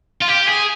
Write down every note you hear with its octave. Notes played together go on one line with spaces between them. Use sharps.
F4
G4
G#4